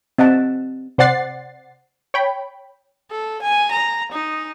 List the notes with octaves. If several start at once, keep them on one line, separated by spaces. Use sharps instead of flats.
C4 D#5 F#5 A5
C3 C5 D5 F#5 A6 C7
C#5 G5 B5
A4
G#5
A#5
D#4